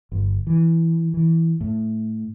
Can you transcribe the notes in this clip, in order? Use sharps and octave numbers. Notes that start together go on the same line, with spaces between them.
G1
E3
E3
A2